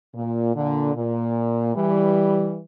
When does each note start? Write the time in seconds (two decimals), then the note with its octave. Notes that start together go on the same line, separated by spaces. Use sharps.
0.15 A#2
0.55 A#2 D3
0.95 A#2
1.75 E3 G3